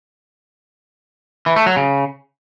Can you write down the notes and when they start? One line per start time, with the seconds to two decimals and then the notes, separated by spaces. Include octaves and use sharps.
1.46 E3
1.56 A3
1.66 F#3
1.76 C#3